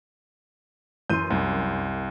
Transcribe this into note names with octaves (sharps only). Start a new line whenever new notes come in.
F#2 E3 C6 G6 D#7
C2 F#2